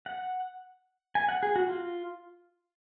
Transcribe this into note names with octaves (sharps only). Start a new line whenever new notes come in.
F#5
G#5
F#5
G#4
F#4
F4